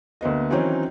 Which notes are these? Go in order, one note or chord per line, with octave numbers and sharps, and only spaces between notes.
D2 A#3 B3 D#5
D#3 E3 F#3 C4 C#4 D#4